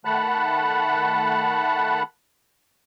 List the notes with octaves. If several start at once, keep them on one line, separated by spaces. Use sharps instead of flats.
D#3 A3 F#5 A5 B5 F#6